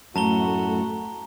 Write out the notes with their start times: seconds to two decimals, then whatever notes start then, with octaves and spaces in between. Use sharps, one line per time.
0.16 F#2 A2 A3 F#4 A5 A#5 G7